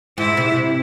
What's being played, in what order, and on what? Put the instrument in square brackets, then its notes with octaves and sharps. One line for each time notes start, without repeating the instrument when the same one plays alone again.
[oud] G#2 [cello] E4
[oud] C3